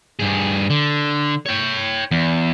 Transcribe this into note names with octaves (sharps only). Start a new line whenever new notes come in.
G2 G#4
D3
C#5 G5
E2